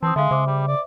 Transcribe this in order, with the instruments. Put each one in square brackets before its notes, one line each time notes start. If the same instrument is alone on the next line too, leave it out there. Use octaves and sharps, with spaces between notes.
[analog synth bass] E3 [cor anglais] C4 [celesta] A5 D#6
[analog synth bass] D3 [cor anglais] G#3 [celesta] E5 F5
[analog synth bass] C#3 [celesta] C5 E5 D6
[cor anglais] G3
D5